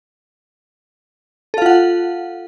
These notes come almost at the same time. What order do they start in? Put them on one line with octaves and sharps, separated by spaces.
A4 F5 F4 F#5